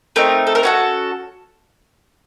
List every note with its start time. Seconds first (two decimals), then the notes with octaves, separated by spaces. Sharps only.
0.16 A3 C4 D#4 A#4
0.47 A4
0.55 A#4
0.63 C#4 F#4 A4 B4